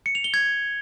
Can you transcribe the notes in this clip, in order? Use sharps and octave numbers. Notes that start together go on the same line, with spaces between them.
C#7
F7
G7
G#6